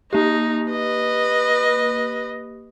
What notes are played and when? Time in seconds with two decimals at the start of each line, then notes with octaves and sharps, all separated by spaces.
0.13 A#3 D#4 G4
0.70 B4 D#5